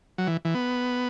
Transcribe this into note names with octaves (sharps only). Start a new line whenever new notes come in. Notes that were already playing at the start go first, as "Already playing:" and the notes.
F#3
E3
E3
B3